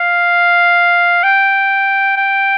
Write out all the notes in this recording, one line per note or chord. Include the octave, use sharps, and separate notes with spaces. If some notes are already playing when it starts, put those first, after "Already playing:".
Already playing: F5
G5
G5